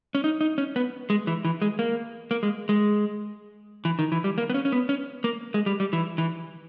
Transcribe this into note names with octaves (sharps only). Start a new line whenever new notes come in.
C#4
D#4
D#4
C#4
B3
G#3
E3
E3
G#3
A#3
A#3
G#3
G#3
E3
D#3
E3
G3
A#3
B3
C#4
C#4
B3
C#4
A#3
G#3
G3
G3
E3
E3